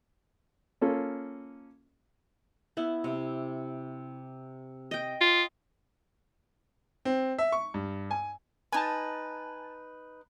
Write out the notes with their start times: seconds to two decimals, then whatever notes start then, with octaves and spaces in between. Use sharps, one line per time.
0.81 A#3 C#4 F4 A4
2.77 B3 E4
3.04 C3
4.91 D#5 G5
5.21 F4
7.05 C4
7.38 E5
7.52 C#6
7.74 G2
8.11 G#5
8.72 D#4 B4 G#5 A5